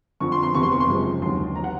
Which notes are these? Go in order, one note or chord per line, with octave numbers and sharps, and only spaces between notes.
F2 D3 F3 C#6
C6
C6
F1 E2 C3 C#6
C6
C#6
C6
G#1 F#2 C#3 F3 G#3
D#2 D3 F#3 C6
E3 A#5
F#5